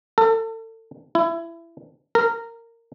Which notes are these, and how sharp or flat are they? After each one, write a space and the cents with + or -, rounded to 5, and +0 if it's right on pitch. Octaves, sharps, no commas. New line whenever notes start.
A4 +35
E4 +20
A#4 -15